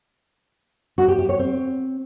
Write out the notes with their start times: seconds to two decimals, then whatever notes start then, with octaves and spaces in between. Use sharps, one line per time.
0.98 F#4
1.08 G4
1.19 G4
1.29 C#5
1.39 C4